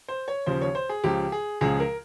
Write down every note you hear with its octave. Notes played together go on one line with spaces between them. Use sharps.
C5
C#5
D#2 C#3 F3 C5
C#5
C5
G#4
C#2 C#3 F3 G4
G#4
C#2 C#3 F3 G#4
A#4